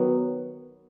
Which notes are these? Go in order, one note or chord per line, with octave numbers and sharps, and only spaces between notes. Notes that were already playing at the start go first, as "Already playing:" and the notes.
Already playing: D#3 F#3 B3